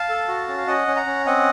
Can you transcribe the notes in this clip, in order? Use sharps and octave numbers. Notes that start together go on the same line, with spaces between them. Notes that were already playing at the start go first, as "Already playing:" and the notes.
Already playing: F5 A5
A4
F#4
C#4
F5
C#4 D#5 F#5
C#4
F#5 A#5
C#4
C4 D#5 F#5